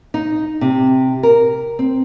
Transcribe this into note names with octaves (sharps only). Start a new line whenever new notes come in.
D#4
C3
A#4
C4